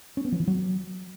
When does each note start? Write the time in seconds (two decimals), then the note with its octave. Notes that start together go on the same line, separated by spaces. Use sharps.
0.17 C#4
0.25 B3
0.32 F3
0.40 E3
0.47 F#3